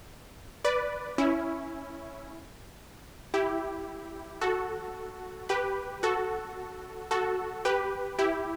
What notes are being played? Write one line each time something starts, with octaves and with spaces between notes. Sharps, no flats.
B4 D5
C#4 E4
E4 G4
F#4 A4
G4 B4
F#4 A4
F#4 A4
G4 B4
E4 G4